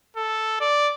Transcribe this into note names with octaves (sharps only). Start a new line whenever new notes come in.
A4
D5